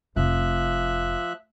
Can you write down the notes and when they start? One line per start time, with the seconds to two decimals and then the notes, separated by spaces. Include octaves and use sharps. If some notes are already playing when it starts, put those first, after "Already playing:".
0.16 F1 F3 E5 F#6